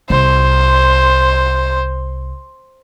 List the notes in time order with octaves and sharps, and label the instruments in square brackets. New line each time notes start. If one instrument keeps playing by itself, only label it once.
[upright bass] C2 [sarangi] C5